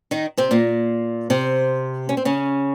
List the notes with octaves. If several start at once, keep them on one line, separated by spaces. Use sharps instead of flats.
D#3 D#4
C3 C4
A#2 A#3
C3 C4
C#4
C4
C#3 C#4